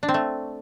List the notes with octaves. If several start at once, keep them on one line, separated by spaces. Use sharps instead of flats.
D4
C4
A3